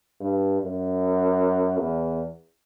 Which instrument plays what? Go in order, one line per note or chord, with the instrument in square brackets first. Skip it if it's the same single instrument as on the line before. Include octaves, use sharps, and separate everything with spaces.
[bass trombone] G2
F#2
E2